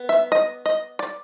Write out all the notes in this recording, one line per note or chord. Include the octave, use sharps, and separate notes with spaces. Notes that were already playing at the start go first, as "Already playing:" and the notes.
Already playing: B3
E5
D#5
D#5
D5